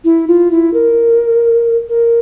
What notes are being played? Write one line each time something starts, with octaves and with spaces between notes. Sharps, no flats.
E4
F4
E4
A#4
A#4